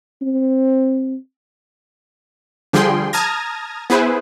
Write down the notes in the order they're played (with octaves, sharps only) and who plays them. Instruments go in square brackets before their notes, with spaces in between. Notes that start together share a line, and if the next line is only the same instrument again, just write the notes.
[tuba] C4
[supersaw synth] D3 F3 G3 G#4 G5 C6
A5 A#5 D#6 F6 G#6 A#6
B3 E4 G#4 B4 C5